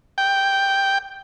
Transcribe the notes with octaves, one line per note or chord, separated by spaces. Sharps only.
G5